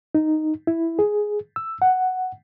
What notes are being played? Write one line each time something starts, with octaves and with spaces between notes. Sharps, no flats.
D#4
E4
G#4
E6
F#5